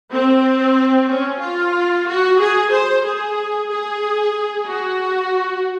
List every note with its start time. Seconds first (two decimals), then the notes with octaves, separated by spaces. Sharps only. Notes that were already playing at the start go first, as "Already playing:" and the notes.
0.11 C4
1.08 C#4
1.41 F4
2.07 F#4
2.40 G#4
2.73 C5
3.05 G#4
3.70 G#4
4.68 F#4